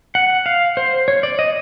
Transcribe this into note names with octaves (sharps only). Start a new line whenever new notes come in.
F#5
F5
C5
C#5
D5
D#5